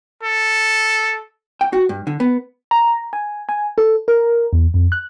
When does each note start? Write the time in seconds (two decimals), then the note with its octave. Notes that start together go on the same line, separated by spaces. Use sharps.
0.23 A4
1.61 G5
1.73 F#4
1.89 G2
2.07 D3
2.20 B3
2.71 A#5
3.13 G#5
3.49 G#5
3.78 A4
4.08 A#4
4.53 E2
4.74 F2
4.92 F#6